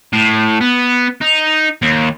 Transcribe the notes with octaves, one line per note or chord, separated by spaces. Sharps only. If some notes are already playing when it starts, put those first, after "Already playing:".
A2
B3
D#4
D#2